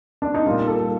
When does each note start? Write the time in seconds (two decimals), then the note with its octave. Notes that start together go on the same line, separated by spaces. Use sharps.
0.22 D4
0.34 D#4
0.46 A#2 G3 A#3 F4
0.67 A4